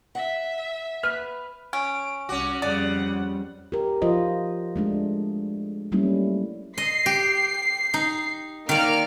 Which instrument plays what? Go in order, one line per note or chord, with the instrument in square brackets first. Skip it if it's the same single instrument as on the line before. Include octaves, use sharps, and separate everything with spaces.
[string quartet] E5 [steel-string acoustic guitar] F#5
[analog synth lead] B4 [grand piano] F6
[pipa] C#4 [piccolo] D7
[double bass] C2 [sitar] C#4 F#4 [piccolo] D6
[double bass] F2 G3 [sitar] C#3 [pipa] D5 [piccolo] F#5
[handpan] G4 A#4
F3 F4 C5 D#5
G#3 A3 D4
F#3 G3 A3 A#3 C#4 E4
[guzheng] D#5 [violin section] C7
[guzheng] G4
D#4
[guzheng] D#3 D5 [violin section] A#3 F6 D7